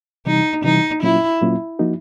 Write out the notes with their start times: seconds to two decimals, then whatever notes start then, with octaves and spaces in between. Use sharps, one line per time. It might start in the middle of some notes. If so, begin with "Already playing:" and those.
0.26 C3 E3 G3 D#4
0.64 C3 E3 G3 D#4
1.03 A#2 F#3 A#3 C#4 E4 F4
1.41 A#2 F#3 A#3 C#4 F4
1.79 F3 A#3 D#4 F#4